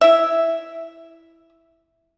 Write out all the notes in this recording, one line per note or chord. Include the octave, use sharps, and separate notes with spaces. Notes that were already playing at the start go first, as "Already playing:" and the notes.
E4 E5